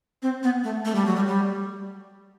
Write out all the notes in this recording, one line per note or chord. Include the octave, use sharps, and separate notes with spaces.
C4
B3
A3
A3
G3
F#3
G3
G3